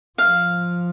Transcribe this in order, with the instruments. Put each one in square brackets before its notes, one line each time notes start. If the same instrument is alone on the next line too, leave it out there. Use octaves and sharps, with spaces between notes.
[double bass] F3 [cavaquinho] F5